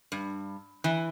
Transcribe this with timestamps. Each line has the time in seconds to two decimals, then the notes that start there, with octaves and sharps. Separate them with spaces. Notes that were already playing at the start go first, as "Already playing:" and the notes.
0.12 G2
0.84 E3